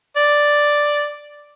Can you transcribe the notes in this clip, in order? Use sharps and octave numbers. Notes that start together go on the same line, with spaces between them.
D5